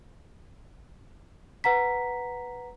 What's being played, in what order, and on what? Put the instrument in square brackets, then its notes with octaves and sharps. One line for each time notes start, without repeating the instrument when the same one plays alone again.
[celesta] B4 F#5 A#5 B6